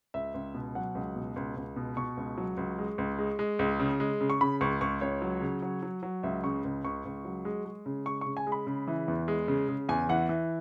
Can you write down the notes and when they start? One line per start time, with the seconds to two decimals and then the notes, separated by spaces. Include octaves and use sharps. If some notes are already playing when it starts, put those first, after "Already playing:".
0.14 C#2 E5
0.34 C#2
0.54 B2
0.75 F#3 F#5
0.95 C#2
1.16 B2
1.36 C#2
1.57 C#2
1.76 B2
1.97 B2 C#6
2.17 C#2
2.38 F#3
2.57 C#2
2.79 G#3
2.98 C#2
3.19 G#3
3.39 G#3
3.59 C#2
3.80 C#3
4.00 G#3
4.21 C#3
4.30 C#6
4.41 C#3 B5
4.61 C#2 C#6
4.81 C#2 C#6
5.01 C#2 C#5
5.22 F#3
5.42 C#3
5.62 F#3
5.83 F#3
6.03 F#3
6.23 C#2 E5
6.44 C#3 C#6
6.64 C#2
6.84 C#2 C#6
7.05 C#2
7.25 F#3
7.45 G#3
7.65 G#3
7.86 C#3
8.06 G#3 C#6
8.21 C#6
8.26 C#3
8.37 G#5
8.47 G#3
8.52 B5
8.67 C#3
8.88 E3
9.08 E2
9.28 G#3
9.48 C#3
9.69 C#3
9.89 E2 G#5
10.09 E3 F#5
10.29 E3